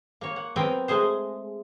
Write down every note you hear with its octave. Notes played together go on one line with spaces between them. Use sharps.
A#3 C#5
F#5
F#3 B3 C4 A#4 G5 G#5
G#3 A3 G#4 C5